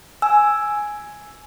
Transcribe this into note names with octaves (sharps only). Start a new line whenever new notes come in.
G#5 E6